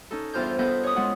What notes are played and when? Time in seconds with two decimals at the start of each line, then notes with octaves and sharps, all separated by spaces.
0.11 C#4 D#4 A4
0.33 E2 G2 F4 C5 F6 G6
0.59 B3 A4 B4 D#5 F5 G6
0.83 C#5 D#6
0.96 G#3 B3 C#4 F4 F#5